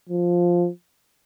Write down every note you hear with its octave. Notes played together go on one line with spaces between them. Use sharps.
F3